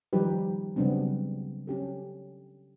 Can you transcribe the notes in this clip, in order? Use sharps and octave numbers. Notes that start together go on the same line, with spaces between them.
D#3 F3 G3 D#4 G4 B4
C#3 F#3 G3 B3 C4 D4
C#4 G4 A4